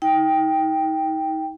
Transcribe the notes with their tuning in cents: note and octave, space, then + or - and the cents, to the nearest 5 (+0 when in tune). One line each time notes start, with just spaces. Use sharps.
D#4 +35 G5 +0